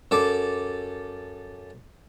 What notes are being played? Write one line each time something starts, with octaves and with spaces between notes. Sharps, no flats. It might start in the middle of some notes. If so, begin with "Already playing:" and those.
F#2 A4 D6